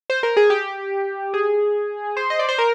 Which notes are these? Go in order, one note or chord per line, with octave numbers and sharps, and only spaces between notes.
C5
A#4
G#4
G4
G#4
C5
D#5
D5
C5
A#4